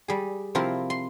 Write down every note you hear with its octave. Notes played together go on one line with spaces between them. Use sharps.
G3 G#4
C3 F3 C4 E4 A#4
C6